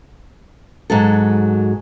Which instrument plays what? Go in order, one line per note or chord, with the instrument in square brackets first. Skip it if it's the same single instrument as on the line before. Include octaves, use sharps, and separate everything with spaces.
[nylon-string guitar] G#2 F#3 A4